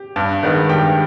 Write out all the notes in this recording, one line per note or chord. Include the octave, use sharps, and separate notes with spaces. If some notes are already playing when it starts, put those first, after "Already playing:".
Already playing: G4
G2
D#3 G#3 B3
G2 G4 G5